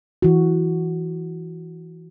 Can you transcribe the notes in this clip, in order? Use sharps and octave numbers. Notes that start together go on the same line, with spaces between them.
E3 F#4